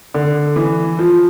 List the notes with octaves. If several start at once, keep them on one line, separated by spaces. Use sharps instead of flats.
D3
E3
F3